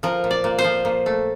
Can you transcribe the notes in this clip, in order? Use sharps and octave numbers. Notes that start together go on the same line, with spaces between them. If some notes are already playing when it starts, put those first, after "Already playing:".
F3 A#4
A#2
D5
A#2
C5
F3
A#2
A3